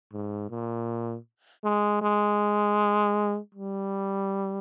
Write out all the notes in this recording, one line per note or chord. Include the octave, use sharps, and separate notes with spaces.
G#2
A#2
G#3
G#3
G3